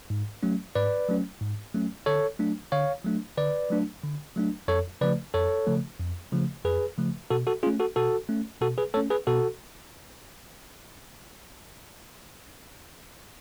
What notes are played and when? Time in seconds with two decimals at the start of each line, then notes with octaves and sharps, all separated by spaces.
0.10 G#2
0.43 F#3 A3 C#4
0.75 G#2 B4 D5
1.08 F#3 A3 C#4
1.41 G#2
1.74 F#3 A3 C#4
2.06 D3 A4 C#5
2.39 F#3 A3 D4
2.72 D3 C#5 F5
3.04 F#3 A3 D4
3.37 D3 B4 D5
3.70 F#3 A3 D4
4.03 D3
4.36 F#3 A3 D4
4.68 F2 A4 C#5
5.01 C#3 F3 A3 B4 D5
5.34 F2 A4 C#5
5.67 C#3 F3 A3
6.00 F2
6.32 C#3 F3 A3
6.65 F2 G#4 B4
6.98 C#3 F3 A3
7.30 B2 F#4 A4
7.47 F#4 A4
7.63 A3 C#4 F4 G#4
7.80 F#4 A4
7.96 B2 F#4 A4
8.29 A3 C#4
8.61 B2 F#4 A4
8.78 G#4 B4
8.94 A3 C#4 A4 C#5
9.10 G#4 B4
9.27 B2 F#4 A4